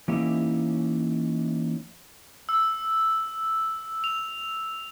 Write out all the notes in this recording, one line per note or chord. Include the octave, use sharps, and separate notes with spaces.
E3 A#3 C#4 D#4 E4 G4
E6
F7